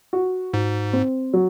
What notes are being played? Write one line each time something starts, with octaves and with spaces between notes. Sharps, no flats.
F#4
G#2 F#4
C4
F#3